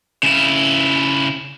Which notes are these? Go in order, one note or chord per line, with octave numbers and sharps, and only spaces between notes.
C#3 E4